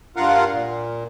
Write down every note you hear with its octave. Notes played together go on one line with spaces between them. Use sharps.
G2 F4 A#4 F5 F#5
A#2